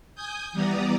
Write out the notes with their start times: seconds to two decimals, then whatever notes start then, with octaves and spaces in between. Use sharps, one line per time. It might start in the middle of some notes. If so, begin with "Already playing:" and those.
0.15 G#5 D#6 G6
0.52 E3 G3 B3 D5 A#5 D#6